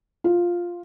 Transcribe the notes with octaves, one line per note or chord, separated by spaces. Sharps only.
F4